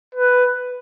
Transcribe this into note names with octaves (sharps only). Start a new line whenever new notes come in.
B4